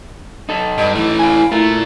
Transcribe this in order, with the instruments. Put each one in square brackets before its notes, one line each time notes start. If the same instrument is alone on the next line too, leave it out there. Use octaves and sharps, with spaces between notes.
[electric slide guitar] D#4 A4
[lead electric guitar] G2 [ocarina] D#5
[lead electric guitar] E3 A3 [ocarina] E4
[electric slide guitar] F5 G#5
[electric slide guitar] A3 [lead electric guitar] F4 A#4